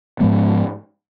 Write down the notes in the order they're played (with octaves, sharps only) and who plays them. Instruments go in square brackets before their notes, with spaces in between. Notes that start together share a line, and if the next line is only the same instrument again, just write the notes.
[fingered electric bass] G#2 F3 G#3 B3